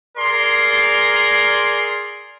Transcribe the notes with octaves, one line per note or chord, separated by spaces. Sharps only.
G#4 A#4 D5 C6